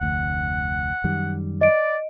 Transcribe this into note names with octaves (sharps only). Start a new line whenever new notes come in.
F1 D2 F#5
F#2 D#3 G3
D5 D#5 D7